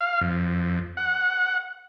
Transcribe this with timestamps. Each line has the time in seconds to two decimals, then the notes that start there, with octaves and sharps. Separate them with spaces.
0.01 F5
0.21 F2
0.97 F#5